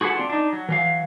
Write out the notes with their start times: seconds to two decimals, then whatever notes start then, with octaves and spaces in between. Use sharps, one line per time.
0.01 F#4 G#4 A4 B4 F#5
0.15 C4 D4 F4
0.30 D4 D#4
0.53 F#3
0.69 E3 F#3 F5